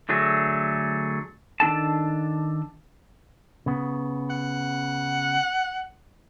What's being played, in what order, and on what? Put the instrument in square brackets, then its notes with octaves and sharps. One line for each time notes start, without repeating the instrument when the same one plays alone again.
[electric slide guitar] D3 F#3 A3 G#4
D#3 D4 A4 A5
[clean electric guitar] C#3 B3
[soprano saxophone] F#5